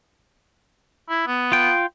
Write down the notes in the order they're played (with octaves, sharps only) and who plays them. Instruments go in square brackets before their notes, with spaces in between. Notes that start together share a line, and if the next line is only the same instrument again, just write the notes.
[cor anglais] E4
B3
[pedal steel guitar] F4 G5